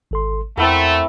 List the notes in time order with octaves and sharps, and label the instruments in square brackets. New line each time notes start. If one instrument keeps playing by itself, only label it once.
[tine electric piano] G#1 A4 C6
[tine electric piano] E2 F#5 [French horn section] A3 [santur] C4 E4 A#4